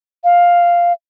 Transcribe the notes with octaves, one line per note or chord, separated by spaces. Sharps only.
F5